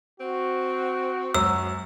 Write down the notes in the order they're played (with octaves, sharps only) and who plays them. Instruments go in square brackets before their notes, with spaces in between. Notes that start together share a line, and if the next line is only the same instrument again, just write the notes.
[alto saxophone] C4 [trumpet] F#4
[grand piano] F#2 [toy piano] E6